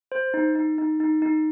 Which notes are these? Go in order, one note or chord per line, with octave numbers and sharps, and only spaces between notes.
C5
D#4
D#4
D#4
D#4
D#4